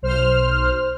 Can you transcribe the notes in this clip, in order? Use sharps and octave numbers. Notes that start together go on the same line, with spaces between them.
B1 C5 F6